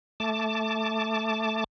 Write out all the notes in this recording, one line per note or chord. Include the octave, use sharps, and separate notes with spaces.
A3 A5 D6